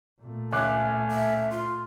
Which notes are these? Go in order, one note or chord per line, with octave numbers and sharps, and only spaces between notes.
A#2 A3
C#2 E5 G#5 D6 F#6
E5
F4 C6